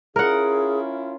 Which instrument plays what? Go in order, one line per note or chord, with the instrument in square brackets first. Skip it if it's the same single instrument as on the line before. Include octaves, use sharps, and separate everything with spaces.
[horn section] C#4 E4 F4 [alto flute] G#4 [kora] A#4 F#5